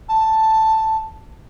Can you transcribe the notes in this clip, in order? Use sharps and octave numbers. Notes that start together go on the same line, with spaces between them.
A5